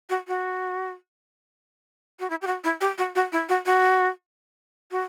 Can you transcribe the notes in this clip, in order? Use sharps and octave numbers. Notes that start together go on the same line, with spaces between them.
F#4
F#4
F#4
E4
G4
F#4
E4
G4
F#4
F#4
E4
F#4
F#4
F#4